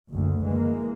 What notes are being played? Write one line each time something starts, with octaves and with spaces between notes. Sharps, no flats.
F#1 D2
E3 G#3 A#3